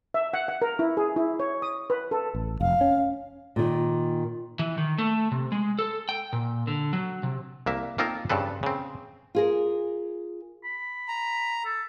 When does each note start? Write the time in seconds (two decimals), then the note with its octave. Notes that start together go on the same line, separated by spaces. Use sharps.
0.14 E5
0.34 F#5
0.48 F#5
0.62 A#4
0.79 E4
0.97 G#4
1.16 E4
1.40 C#5
1.62 D#6
1.90 B4
2.11 A4
2.35 A1
2.61 F1 F5
2.81 C#4
3.56 A#2 D#3
4.59 E3
4.78 D#3
4.98 A3
5.32 C3
5.52 G#3
5.79 A4
6.09 G5
6.33 A#2
6.67 D3
6.93 F#3
7.23 C3
7.66 C2 A#3 E5
7.98 A#3 C4 D#4 F4 A4 A#4
8.29 G2 C#3 C4 A4 B4
8.63 C#3 C4
9.35 F4 G#4 A#4
10.64 B5
11.08 A#5
11.65 A4